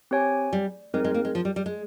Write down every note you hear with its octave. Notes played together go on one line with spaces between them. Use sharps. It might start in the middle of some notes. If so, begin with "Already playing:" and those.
C4 G4 C#5 G#5
G3
G#3 C4 D#4 A#4
G#3
A#3
G#3
F3
G3
G3
G#3